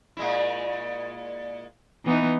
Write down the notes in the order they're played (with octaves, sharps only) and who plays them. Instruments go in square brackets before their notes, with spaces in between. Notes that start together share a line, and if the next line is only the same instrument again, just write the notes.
[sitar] A#2 G#3 E4
[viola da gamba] E3 B3 D#4